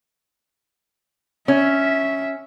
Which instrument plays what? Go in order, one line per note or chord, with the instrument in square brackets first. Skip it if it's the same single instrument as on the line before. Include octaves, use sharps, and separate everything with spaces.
[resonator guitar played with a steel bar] C#4 [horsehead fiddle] E5